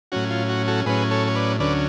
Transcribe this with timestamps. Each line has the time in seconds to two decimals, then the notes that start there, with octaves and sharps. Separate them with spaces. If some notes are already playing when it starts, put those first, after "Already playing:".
0.12 A2 F#3 C#4 F#4
0.30 F4
0.49 F#4
0.68 F#4 A4
0.86 A2 F#3 C#4 G#4 B4
1.11 A4 C#5
1.27 C#5
1.35 B4 D5
1.60 D2 D3 F#3 C#4 B4 D5